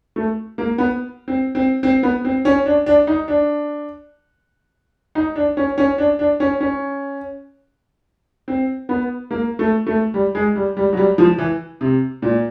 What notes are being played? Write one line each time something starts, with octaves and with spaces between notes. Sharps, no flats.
A3
A#3
B3
C4
C4
C4
B3
C4
C#4
D4
D4
D#4
D4
D#4
D4
C#4
C#4
D4
D4
C#4
C#4
C4
B3
A#3
A3
A3
G3
G#3
G3
G3
F#3
G3
F3
E3
C3
A#2